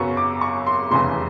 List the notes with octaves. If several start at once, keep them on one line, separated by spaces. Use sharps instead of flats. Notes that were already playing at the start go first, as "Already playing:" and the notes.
Already playing: F#2 C#3 F#3 B3 C#6
D6
C#6
C6
F1 E2 C#3 E3 C6